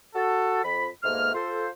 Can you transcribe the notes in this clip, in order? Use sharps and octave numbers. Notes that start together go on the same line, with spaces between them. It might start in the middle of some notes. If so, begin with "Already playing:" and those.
F#4 A4
F2 B5
G#2 B2 A3 A#3 F6
F4 A4 C5